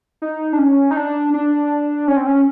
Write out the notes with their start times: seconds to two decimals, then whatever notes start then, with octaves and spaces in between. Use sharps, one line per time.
0.22 D#4
0.53 D4
0.59 C#4
0.91 D#4
0.97 D4
1.34 D4
2.08 C#4
2.17 C4
2.26 C#4